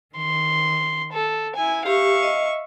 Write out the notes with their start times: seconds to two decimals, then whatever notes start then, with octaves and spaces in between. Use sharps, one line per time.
0.14 D#3 C6
1.12 A4
1.54 E4 G#5
1.86 G4 E5 F5 C#6
2.23 D#5